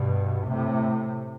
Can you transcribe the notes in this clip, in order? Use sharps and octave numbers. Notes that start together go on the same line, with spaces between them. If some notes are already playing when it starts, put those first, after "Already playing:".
Already playing: G2 B2
A2 C3